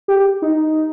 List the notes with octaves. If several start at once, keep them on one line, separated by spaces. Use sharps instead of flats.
G4
G4
D#4